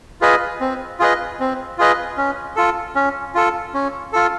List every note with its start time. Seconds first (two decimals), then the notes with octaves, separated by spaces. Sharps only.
0.21 F4 G#4 B4 D#5
0.60 C4
0.99 F4 G#4 B4 D#5
1.40 C4
1.78 F4 G#4 B4 D#5
2.17 C#4
2.56 F4 A4
2.95 C#4
3.35 F4 A4
3.74 C#4
4.13 F4 A4